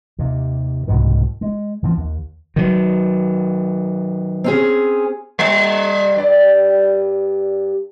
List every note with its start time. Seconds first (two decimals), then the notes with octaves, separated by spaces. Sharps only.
0.19 D#2 C3
0.87 C2 G#2 B2 D#3
1.41 G#3
1.83 E3 F3 C4
1.97 D#2
2.56 D#3 F#3
4.44 C4 C#4 G#4
5.39 G3
6.16 G2 D5